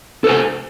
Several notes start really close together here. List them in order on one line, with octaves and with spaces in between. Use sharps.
A4 C5 G#5